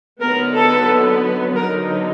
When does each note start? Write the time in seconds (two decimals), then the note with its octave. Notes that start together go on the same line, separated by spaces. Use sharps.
0.21 D3 F#3 B3 D#4 A#4
0.55 A4
1.55 D3 F#3 B3 D#4 A#4